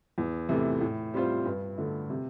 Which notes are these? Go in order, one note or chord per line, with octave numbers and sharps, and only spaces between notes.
E2
C3 E3 A3
A2
G3 C4 F4 C5
G2
D3 A3
C3